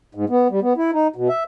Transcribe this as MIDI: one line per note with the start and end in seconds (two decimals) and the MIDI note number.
0.15 0.25 44
0.30 0.48 59
0.50 0.60 55
0.62 0.73 59
0.77 0.91 64
0.93 1.08 63
1.16 1.28 47
1.29 1.44 76